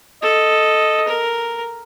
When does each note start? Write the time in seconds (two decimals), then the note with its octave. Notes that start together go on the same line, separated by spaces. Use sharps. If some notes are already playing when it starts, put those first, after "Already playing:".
0.23 A4 D#5
1.08 A#4